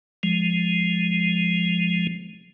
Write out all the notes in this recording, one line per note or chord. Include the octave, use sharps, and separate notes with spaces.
F3 G#3